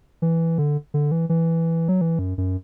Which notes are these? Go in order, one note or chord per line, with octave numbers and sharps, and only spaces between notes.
E3
D3
D3
E3
E3
F#3
E3
F#2
F#2